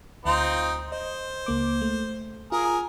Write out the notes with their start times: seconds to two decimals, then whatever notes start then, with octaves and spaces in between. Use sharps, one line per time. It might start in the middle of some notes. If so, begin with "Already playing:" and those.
0.25 D2 C4 D#4 F4
0.92 C5 D#5
1.46 C#2 A#3 D6
1.81 A3
2.52 F4 G#4 A#4